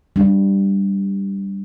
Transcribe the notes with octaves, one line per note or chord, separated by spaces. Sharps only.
G3 D4